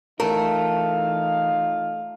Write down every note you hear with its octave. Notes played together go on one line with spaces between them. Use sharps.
E3 A3 D#4 F4 A#4 F5